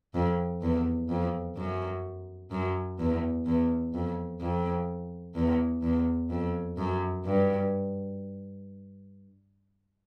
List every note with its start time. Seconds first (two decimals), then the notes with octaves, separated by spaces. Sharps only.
0.14 F2
0.62 E2
1.09 F2
1.56 F#2
2.51 F#2
2.99 E2
3.46 E2
3.94 F2
4.41 F2
5.35 E2
5.83 E2
6.30 F2
6.78 F#2
7.25 G2